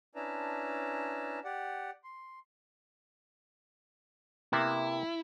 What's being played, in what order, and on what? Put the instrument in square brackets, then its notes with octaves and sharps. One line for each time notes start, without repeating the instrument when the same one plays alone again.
[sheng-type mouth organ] C#4 D4 E4 B4 A5 A#5
G4 D5 F#5
C6
[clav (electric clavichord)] C3 A#3 B3 [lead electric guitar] E4